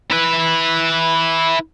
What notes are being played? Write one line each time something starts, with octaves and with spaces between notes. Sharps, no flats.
E4 B4